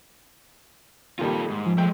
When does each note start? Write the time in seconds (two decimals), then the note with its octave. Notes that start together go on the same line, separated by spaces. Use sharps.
1.19 A#2 D#3 G3 F4 A4
1.50 G#2
1.66 F3
1.78 G#3 A3 G5